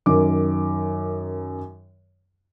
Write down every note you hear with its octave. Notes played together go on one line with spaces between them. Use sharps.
F#2 D#3 D6